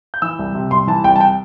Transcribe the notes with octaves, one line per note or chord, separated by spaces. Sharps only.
G6
E3 E6
C2
C3
C2 C6
E3 A5
C2 G5
A5
G5